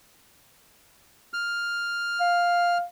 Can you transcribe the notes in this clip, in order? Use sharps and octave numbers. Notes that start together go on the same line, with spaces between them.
F6
F5